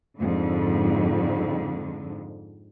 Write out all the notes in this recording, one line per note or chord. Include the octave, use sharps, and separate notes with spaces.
F2 G#2 D3